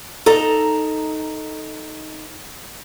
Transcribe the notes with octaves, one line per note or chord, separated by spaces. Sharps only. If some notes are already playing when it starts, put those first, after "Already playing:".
D#4 A4 A#5